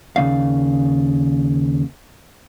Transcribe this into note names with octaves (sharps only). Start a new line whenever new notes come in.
D#2 C#3 A#3 D5 F5